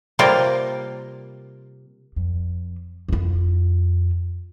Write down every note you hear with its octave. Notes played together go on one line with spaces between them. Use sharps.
C3 G3 A#3 F4 A#4 G5
F2
F2 F4